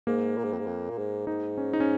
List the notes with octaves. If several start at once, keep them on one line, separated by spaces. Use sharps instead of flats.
G#2 A#3
A#2
G#2
F2
G#2
F2
A#2
G#2
G#2 D#4
C#4
D#4
C#4